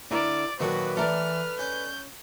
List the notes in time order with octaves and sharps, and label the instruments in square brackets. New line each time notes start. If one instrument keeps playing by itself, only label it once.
[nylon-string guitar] D3 E4 A#4 [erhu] D5
[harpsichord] A#2 D#3 F#3 [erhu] F#4 [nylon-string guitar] A4 [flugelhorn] B4
[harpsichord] E3 [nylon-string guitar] A4 A#4 D5 [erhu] F6
[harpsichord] C#4 [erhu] G6